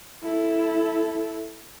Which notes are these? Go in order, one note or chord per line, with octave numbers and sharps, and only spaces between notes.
E4 A4